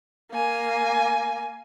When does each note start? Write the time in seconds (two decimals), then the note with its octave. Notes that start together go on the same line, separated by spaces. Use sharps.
0.31 A#3 G#5